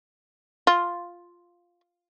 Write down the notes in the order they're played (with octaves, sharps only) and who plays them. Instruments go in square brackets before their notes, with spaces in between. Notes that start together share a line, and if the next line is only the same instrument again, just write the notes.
[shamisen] F4